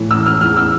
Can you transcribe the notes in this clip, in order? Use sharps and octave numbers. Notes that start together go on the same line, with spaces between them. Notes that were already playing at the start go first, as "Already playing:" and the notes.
Already playing: A2 E3
E6
F6
E2 E3 F6
E6